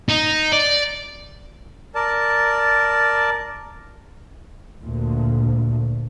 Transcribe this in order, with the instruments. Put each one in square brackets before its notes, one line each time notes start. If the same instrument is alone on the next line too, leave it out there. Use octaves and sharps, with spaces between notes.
[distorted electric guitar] D#4
D5
[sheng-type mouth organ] A#4 D5 A5
[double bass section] D2 A#2